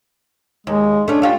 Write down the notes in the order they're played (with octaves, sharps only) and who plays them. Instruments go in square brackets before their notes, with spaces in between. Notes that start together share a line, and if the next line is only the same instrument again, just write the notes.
[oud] D#2 [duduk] G#3
[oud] A3 C#4 [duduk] D4
[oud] A3 F4 G4